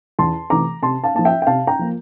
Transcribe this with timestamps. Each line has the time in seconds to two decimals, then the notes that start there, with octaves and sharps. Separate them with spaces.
0.19 E2 A5 C6
0.50 C3 E3 A3 A#5 D6
0.82 C3 A5 C6
1.03 F5 A5
1.15 F3 A#3 A5
1.25 E5 G5
1.42 G5
1.47 C3 F5 A5
1.67 G5 A#5
1.79 F3 A#3